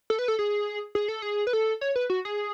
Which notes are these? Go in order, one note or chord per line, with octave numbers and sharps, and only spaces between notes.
A4
B4
A4
G#4
G#4
A4
G#4
B4
A4
C#5
B4
F#4
G#4